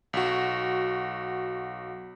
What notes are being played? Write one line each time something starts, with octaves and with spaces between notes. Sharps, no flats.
B1 F#4